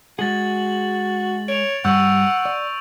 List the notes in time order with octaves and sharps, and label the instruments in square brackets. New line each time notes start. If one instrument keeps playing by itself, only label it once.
[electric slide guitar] G#3 G#4 [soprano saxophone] F#4 [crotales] A6 F#7
[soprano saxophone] C#5 [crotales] D7 F7
[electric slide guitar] G2 G3 [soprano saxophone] F#5 [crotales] C#6 E6 G6
[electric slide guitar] D5